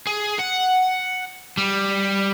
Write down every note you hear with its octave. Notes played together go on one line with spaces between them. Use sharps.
G#4
F#5
G3